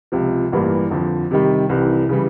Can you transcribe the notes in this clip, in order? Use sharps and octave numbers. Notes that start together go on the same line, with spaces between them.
C#2 C3 F3
A1 G2 E3 G3 A#3
F2 D3 F3
C3 D#3 G3
C2 C3 E3
C#3 E3 G3